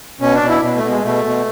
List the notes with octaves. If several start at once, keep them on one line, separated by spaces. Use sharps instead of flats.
B2 C#4
D4
B2
E4
B2
A3
B2
G#3
B2 A3
B2